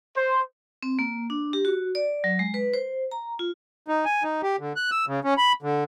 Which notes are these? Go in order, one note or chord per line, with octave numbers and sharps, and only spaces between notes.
C5
C4
A#3
D4
G4
F#4
D5
F#3
G#3
B4
C5
A#5
F4
D#4
G#5
D#4
G4
D3
F#6
E6
C#3
C#4
B5
D3